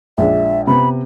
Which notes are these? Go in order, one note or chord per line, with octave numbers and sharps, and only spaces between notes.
A#1 G#3 D4 E5
C3 B3 B5